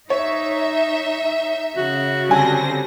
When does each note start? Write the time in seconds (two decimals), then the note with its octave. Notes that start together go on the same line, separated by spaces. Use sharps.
0.10 D#4 C#5 E5
1.77 C#3 F#4
2.29 D3 G3 C4 G#5 A5 A#6